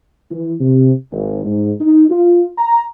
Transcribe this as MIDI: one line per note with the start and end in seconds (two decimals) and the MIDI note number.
0.31 0.53 52
0.61 0.92 48
1.12 1.42 32
1.45 1.72 44
1.80 2.05 63
2.10 2.44 65
2.58 2.81 82